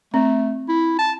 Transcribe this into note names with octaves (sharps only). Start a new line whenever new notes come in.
A3 C4
E4
A5